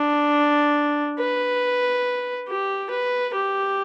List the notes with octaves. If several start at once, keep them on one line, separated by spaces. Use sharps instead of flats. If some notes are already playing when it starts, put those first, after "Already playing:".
Already playing: D4
B4
G4
B4
G4